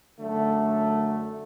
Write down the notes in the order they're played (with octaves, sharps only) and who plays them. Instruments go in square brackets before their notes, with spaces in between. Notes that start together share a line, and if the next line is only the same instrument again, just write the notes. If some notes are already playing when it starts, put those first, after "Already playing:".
[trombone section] F#2 D3 A3